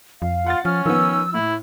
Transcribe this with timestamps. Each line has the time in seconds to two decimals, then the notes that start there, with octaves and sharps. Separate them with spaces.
0.22 F2 F5
0.46 F4 F#5 A6
0.65 F3 C#4 F6
0.86 D#3 F3 B3 E6
1.34 A2 E4